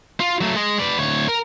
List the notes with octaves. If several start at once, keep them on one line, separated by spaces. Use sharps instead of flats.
F4
F#3 A3
G#3 D#5
B4 D5
D2 C#5
A#4